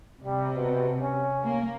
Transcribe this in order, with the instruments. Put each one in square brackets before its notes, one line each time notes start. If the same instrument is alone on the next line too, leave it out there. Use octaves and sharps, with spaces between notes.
[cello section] C3 [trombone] G3
[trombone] B2
C#4
[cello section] A#3